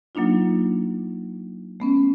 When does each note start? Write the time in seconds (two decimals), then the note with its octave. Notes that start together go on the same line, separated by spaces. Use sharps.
0.15 F#3 A#3 D4 D#4 F4
1.80 A3 B3 C#4